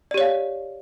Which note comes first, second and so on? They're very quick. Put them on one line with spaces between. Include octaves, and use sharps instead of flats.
D5 G4 C#5 F5